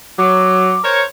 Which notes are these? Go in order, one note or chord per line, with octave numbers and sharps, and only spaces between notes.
F#3 D6
A#4 C5 C#5